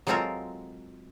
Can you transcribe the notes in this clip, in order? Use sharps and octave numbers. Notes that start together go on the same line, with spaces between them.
F#3 G#3 C4 F4 A4 A#4